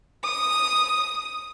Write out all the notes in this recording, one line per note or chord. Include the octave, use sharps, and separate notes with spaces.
D#6